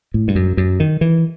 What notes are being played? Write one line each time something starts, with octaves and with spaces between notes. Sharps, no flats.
A2
G2
F#2
F#2
D#3
E3